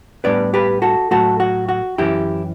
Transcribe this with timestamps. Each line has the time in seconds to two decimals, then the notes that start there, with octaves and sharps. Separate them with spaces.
0.24 A2 G3 B3 D4 B4 D5
0.54 G4 B4
0.82 F#4 A4
1.11 A2 F#3 A3 F#4 A4
1.40 F#4
1.69 F#4
1.98 F#2 E3 A3 C#4 E4 G4